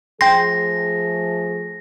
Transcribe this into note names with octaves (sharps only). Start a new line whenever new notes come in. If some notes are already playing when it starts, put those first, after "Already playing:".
F3 A3 G#4 G5 C6 A#6